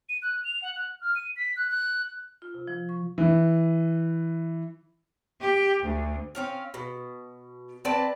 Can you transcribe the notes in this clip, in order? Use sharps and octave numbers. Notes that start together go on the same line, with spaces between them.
D#7
F#6
F7
F#5
F#6
F6
D#7
B6
F#6
F#6
F4
C3
F3
C#6
E3
G4
D2
C4 C#4 F5
B2
C4 B4 D5 A5